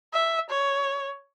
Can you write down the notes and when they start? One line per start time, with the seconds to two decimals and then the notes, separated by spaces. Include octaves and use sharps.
0.13 E5
0.50 C#5